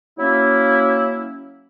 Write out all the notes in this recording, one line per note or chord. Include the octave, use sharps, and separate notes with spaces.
F#3 A#3 C#4 E4